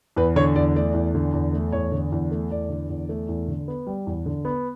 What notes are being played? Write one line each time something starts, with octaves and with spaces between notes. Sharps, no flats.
E2 B4
D3 C#5
E2 D5
A3 D5
E2
D3
E2
A3
E2 C#5
D3
E2
A3
E2 D5
D3
E2
A3
E2
D3
B3
G3
E2
D3
B3